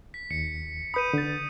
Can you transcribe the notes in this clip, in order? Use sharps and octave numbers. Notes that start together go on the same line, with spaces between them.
B6
D#2 C#7
B4 B5 D#6 G6 D#7
D3 A6